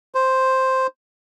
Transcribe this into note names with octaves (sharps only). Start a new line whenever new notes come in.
C5